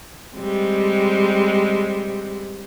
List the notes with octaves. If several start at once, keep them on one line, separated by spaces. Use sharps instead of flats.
G3 G#3 C4